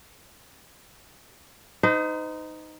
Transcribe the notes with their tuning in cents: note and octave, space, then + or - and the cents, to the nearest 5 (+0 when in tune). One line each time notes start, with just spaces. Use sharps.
D#4 +0 C5 -40